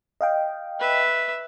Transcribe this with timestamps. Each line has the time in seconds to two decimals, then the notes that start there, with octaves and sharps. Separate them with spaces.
0.21 D#5 F5 G5
0.80 B4 E5